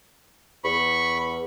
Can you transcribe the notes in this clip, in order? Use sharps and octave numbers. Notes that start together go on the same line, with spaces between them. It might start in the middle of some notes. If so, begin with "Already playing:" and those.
E2 B5 C#6